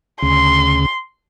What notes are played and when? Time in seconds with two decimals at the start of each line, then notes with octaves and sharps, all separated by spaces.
0.22 D2 C#3 C6